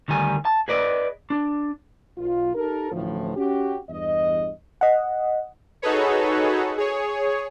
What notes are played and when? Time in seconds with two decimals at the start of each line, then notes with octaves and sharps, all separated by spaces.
0.08 D2 D#3 G3 G#5
0.45 A5
0.68 G#4 B4 D5 D#5
1.30 D4
2.18 B1 F4
2.55 D#4 G4 A4 A#4
2.92 A1 D2 A2 E3 F3
3.36 C#4 F#4 G4
3.90 E2 G2 D#5
4.81 D#5 F#5
5.82 D#4 F#4 G#4 A4 B4 C#5
6.78 G#4 C#5